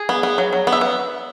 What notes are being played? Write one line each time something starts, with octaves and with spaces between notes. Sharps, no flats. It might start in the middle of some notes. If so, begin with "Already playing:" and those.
Already playing: G#4
B3
B3
F#3
F#3
B3
E5
B3